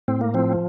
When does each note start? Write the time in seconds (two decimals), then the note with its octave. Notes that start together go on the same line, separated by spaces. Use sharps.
0.08 A2 C4
0.21 A#3
0.34 F3 C4